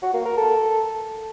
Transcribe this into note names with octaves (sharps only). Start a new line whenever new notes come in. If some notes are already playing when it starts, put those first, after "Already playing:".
F#4
A#3
A#4
A4